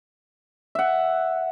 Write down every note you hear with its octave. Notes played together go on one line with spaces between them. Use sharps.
E5 F#5